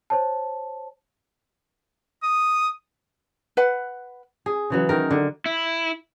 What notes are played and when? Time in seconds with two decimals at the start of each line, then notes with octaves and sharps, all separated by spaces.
0.10 C5 C#5 A5
2.23 D#6
3.57 B4 F#5
4.46 G#4
4.70 C#3 E3 F#3
4.89 D#3 A#4
5.11 D3
5.46 E4